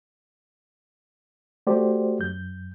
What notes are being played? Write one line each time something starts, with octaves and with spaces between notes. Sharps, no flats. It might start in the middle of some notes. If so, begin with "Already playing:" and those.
A3 F#4 G4 C5 D5
F#2 G6